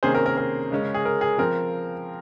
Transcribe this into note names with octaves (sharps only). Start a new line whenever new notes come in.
C3 D#3 A#3 C#4 G#4 C5
A#4
A#4
A#4
C#3 G#3 C#4
G#4
A#4
G#4
F3 C4 A#4